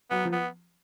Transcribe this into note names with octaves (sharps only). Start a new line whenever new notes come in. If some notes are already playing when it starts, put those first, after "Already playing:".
F#3 B3
F3
B3